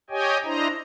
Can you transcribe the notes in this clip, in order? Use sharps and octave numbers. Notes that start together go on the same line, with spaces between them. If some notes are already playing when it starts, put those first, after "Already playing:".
G4 C#5 D#5 G5 G#5
D4 E4 C5 D#5 A#5